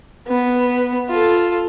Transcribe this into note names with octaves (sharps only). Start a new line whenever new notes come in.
B3
F4 A4